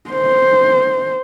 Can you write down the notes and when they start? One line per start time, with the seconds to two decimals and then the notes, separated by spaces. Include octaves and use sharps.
0.10 C5